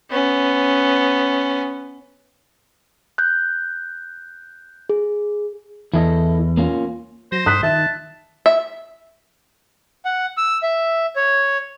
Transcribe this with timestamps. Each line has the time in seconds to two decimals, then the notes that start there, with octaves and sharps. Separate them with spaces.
0.11 B3 C#4
3.18 F#6 G6
4.89 G#4
5.94 E2 E4 A4 D#5
6.57 A#3 C#4 F4
7.32 F#3 C5 A#6
7.46 G2 D#6 F#6 B6
7.63 D#3 E5 A5
8.46 E5
10.05 F#5
10.37 E6
10.63 E5
11.16 C#5